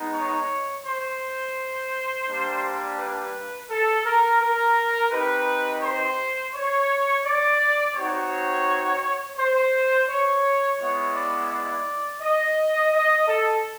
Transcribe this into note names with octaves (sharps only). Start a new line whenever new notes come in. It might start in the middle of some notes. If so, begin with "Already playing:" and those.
Already playing: G#3 B3 D#4
C#5
C5
G3 A#3 D4
B4
A4
A#4
A#4
C4 D#4 G4 B4
C5
C#5
D5
C4 D#4 F#4 C#5
C5
C#5
G#3 B3 E4 C#5
D5
D5
D#5
D#5
A4